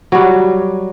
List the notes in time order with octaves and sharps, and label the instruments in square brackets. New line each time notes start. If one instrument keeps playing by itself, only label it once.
[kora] F#3 G3